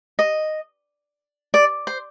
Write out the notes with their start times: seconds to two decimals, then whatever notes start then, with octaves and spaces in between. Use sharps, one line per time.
0.19 D#5
1.54 D5
1.87 C5